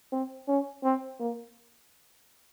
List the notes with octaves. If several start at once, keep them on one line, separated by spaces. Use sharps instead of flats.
C4
C#4
C4
A#3